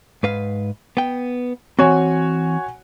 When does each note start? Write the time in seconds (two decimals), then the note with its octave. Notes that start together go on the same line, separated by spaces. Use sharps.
0.23 G#2 B4 F5
0.97 B3 G5
1.79 E3 C4 F#4 C#5 G#5